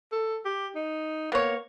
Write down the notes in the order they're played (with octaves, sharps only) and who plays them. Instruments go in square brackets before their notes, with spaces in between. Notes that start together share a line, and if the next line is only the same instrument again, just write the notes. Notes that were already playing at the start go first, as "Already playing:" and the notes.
[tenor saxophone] A4
G4
D#4
[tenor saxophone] A#3 [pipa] B3 C#5